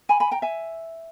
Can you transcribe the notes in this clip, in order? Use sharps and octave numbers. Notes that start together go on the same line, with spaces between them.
G#5 B5
G#5 B5
G5 A#5
E5 G#5